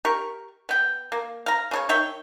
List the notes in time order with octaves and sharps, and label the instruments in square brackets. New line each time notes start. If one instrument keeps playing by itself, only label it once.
[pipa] G4 A#4 C#6
B3 G5
A#3
F5 A#5
C#3 D4 C#5
D#3 C#5 E5 G5